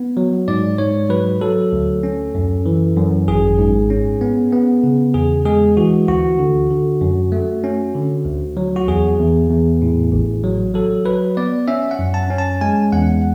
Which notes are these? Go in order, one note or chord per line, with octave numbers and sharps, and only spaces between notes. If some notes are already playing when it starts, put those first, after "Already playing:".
Already playing: B3
F#3
G#2 D5
G#2 C#5
F#3 B4
F#3 A4
D2
C#4
F#2
E3
F#2
G#1 G#4
G#2
C#4
B3
B3
C#3
E2 G#4
G#3 G#4
E3 F#4
D2 F#4
D3
D3
F#2
A3
C#4
D3
D2
F#3
F#4
E2 G#4
E2
E2
A2
A1
F#3
F#3 A4
F#3 B4
B3 D5
C#4 E5
F#5
F#2
A5
C#4
A5
G#3 G#5
E2 F#5